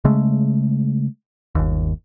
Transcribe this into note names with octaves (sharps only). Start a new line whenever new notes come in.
C#3 G#3 A3
G1 D#2